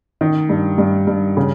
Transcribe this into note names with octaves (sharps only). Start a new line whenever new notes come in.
D#3
G2
G2
G2
C#3